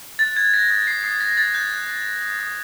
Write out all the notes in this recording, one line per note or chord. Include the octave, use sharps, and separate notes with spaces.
F#6 A6
F#6 G#6
F#6 A#6
D#6 A#6
D#6 C7
D#6 C7
F#6 A#6
F#6 A6
F#6 G6
F#6
F#6
F#6
D#6
D#6